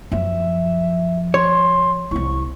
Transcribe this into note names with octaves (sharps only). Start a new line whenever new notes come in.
F#2 F3 E5
C#5 C6
C2 E4 C#6